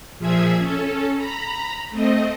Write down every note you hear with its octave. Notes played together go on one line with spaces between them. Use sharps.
A#2 F3 G#4 E5 G#6
C#4 A4
A#5 B5
A3 C4 D#5